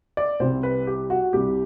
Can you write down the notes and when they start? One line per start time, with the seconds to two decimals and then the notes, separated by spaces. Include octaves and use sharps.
0.17 D5
0.40 C2 C3 G3 C5
0.63 B4
0.87 G4
1.10 F#4
1.33 C2 C3 G3 G4